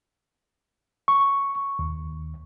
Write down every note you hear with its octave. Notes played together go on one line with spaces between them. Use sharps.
C#6
D#2